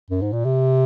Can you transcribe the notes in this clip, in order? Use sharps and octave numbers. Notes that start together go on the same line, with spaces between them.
F#2
G#2
A#2
C3